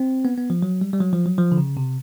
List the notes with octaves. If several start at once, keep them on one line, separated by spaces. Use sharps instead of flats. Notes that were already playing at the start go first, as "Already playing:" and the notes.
Already playing: C4
B3
B3
F3
F#3
G3
G3
F#3
F3
F#3
F3
D3
C#3
C3